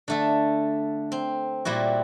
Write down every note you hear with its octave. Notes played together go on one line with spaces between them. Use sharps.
D3 A3 A4
C4
A#2 G3 E4 F#4